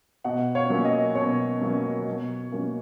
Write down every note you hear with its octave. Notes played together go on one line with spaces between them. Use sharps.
B2 D#5 F#5
C#5 F5
F#3 A#3 C#4
D#5
B2 C#5
F#3 A#3 C#4
B2
F#3 A#3 C#4